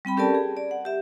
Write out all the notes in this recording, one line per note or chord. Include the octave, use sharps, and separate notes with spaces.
G3 C4 G5 B5
C#4 G4 A4 A#4 D5 A5
G#4
D5
F#5
G4 E5